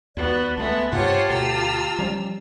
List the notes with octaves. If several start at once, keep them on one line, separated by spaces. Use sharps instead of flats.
D#2 B3 F#4 D5
C#2 G#3 A3 B3 E5 A5
G2 C3 F4 G4 C5 C#5 F#5 A5
D2 B2 A#5 E6 F6
F3 G3 C#4